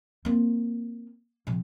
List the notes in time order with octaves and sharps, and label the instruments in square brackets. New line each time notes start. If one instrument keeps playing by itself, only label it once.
[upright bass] A#3 C4
C3 F3